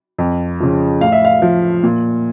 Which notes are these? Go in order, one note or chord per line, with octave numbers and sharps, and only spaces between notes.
F2
C#3 F3
A2 F5
E5
F5
F3
A#2